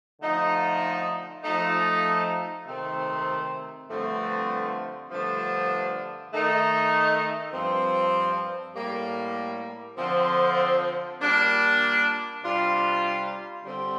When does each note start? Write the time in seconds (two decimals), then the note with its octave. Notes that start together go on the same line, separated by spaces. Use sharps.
0.21 D3 F3 A3 D#4
1.43 F3 A3 D#4
2.65 C3 D#3 A3 C4
3.87 G2 D3 F3 A3 C4
5.09 G2 D3 F3 A3 D4
6.30 D#3 A3 D#4
7.53 G2 F3 C4
8.75 A2 G3 A#3
9.97 D3 F3 C4
11.20 A#2 G3 A#3 D4
12.42 C3 G3 D4 F4
13.63 D3 G3 C4